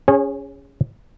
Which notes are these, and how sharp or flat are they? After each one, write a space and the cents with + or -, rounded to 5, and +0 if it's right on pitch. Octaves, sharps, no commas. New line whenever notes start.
C#4 +10 G#4 -20 C#5 -35